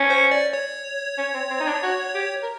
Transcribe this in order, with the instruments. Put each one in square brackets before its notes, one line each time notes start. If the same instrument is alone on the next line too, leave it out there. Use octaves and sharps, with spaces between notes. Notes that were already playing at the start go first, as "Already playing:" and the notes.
Already playing: [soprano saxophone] C#4
[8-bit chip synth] C5
D5
C#5
[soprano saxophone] C#4
C4
C4
D#4
D4
F#4
G4
A#4